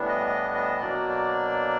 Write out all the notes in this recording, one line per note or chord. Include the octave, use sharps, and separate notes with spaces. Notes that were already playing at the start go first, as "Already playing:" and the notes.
Already playing: A2 E3 G3 B3 D4
D#5
D#5
D#5
B2 F#3 A#3 D4 D5
D5